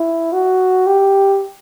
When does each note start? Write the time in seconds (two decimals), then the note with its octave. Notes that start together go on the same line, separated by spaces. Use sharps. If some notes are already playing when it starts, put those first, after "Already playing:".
Already playing: E4
0.33 F#4
0.87 G4